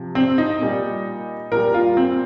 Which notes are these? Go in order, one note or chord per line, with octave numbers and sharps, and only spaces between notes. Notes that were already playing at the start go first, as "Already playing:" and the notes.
Already playing: C3 F3
C4
D#4
A#2 G3
A#2 G3 A#4
F4
C4